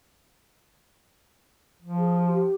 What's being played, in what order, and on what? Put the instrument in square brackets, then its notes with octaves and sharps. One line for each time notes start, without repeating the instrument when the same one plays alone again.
[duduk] F3
[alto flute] G#4
G4